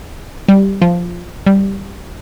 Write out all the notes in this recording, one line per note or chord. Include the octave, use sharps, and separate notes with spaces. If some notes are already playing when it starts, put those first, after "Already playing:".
G3
F3
G3